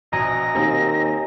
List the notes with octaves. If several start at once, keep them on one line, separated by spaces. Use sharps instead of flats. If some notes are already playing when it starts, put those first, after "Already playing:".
A#1 B2 D#5 G#5 A#5 A#6
D#2 A#3 C4 D#4